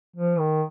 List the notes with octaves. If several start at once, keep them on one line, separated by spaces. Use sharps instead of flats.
F3
D#3